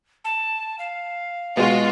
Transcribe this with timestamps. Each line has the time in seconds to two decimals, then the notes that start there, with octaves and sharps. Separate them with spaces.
0.25 A5
0.79 F5
1.57 B2 G#3 F4 F#4